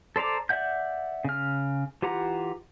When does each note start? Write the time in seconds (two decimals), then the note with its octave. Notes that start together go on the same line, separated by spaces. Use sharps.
0.16 A4 C5 D5 A#5 D6
0.49 D5 E5 F#5 G6
1.25 C#3 F6
2.02 E3 F4 G4 F#5 A#5